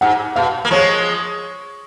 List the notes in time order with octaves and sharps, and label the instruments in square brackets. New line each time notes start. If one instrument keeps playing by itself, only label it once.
[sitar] G#2 [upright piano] F#5
[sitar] B2 [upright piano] F5
[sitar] A#3
[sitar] F3 G#3 [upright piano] C#5